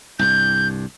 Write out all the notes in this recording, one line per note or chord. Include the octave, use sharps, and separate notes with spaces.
C2 G2 G6